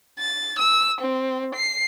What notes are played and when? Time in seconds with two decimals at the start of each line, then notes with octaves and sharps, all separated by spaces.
0.19 A6
0.59 E6
1.01 C4
1.55 C7